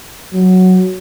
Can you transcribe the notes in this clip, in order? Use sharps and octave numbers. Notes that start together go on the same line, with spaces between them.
F#3